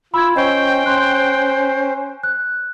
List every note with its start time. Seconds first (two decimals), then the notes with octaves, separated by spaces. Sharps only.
0.14 F4 B5 E6 G#6
0.36 C#4 C5 D#5 G5 C#6
0.86 C#4 C6 F#6
2.23 F#6